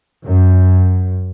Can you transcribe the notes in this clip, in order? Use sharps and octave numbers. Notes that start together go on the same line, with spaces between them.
F#2